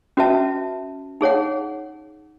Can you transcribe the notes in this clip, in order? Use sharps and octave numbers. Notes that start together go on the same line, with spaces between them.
C#4 F#4 B4 E5 A5
D#4 G#4 C#5 F#5